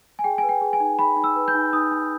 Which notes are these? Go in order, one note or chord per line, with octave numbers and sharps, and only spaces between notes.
G#5
G#4 G5
B4 G#5
G5
G#4
G#5
D#4
G#4 B5
D#4
E6
B4
G6
D#4
D#4 D#6
D#4